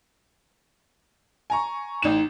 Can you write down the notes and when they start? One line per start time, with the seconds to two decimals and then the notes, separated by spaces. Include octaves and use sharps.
1.50 G#5 A#5 C#6
2.02 A1 D#4 E7